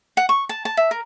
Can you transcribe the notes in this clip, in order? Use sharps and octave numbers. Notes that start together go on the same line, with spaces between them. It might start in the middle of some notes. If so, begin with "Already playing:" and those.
F#5
C#6
A5
A5
E5
A#4